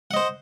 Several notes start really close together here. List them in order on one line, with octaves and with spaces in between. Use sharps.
F#5 D#5 C5